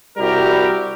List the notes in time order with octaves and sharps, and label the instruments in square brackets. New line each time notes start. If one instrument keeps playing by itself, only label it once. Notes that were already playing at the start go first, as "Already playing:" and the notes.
[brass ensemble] C2 G3 E4 F#4 G4 A#4